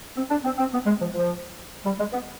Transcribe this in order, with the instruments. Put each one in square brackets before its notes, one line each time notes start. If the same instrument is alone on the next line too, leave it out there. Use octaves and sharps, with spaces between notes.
[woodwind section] C4
D4
C4
C4
B3
G#3
F3
F3
G3
G#3
B3